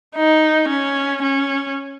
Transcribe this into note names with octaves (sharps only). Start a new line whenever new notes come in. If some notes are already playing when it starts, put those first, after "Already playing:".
D#4
C#4
C#4